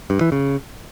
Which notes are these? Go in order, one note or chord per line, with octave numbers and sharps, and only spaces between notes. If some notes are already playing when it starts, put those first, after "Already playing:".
G2
E3
C#3